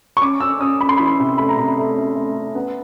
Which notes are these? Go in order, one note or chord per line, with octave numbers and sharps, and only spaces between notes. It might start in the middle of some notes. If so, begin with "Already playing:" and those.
C#6
C#4 D6
C#4 E6
C#4 D#6
C#4 B5
C6
E3 B5
C3
A3 B5
A#5
C3 B5
A3
C#4
A3
C#4
B3